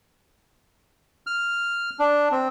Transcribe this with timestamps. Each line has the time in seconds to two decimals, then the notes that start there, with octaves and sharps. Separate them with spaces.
1.27 F6
1.99 D4
2.31 C4